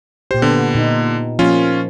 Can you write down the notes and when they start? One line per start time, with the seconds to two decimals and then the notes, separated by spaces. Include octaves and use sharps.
0.31 A#2 G4 C5
0.42 D3 B3
0.74 A#2 D#4
1.39 F3 A#3 C#4 F4